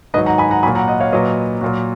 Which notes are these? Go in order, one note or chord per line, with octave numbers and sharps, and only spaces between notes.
G#2 D#3 F#3 B4 D#5
F#5 A#5
G#5 B5
F#5 A#5
A#2 F#3 G#5 B5
F#5 A#5
D#5 F#5
C#5 F5
A#2 F#3 B4 D#5
A#2 F#3